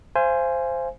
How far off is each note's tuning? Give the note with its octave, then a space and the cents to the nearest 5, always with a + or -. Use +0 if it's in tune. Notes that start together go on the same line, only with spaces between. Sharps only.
C5 +0 F5 -40 G#5 +0